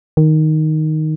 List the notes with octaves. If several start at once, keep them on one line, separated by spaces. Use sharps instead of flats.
D#3